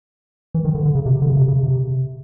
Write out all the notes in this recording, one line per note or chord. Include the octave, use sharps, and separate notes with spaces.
E3
D#3
D3
D3
C#3
C3
D3
C#3
C3
C#3
C3